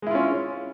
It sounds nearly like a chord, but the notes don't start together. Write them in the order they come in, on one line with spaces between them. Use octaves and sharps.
G#3 E4 F4 C#4